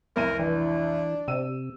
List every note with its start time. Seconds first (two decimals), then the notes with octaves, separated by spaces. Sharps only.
0.16 F1 C2 A#4 D#7
0.39 E3 D4
1.28 C3 E6 D#7